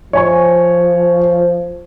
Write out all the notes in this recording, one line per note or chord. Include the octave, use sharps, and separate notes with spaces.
F3 C#5 G#5 C#6